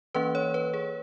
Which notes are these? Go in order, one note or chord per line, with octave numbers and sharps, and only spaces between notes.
E3 A#3 C#4 B4
C#5
B4
G#4